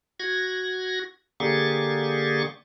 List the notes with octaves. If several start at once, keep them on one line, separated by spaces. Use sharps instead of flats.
F#4 G#6 A#6
D3 A#3 G4 G#4 C#6 A6